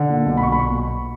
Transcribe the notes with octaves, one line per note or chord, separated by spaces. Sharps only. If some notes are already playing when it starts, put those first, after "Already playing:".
Already playing: D3
A#2
B1
B5
B1 C#6
B5
A#2 C#6